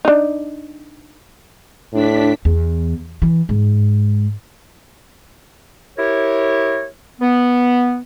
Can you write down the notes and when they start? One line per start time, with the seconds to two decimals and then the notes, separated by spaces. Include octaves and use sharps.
0.05 D4 D#4
1.93 A2 D4 B6
2.45 E2
3.22 E3
3.49 G#2
5.98 E4 G4 A#4 C#5
7.21 B3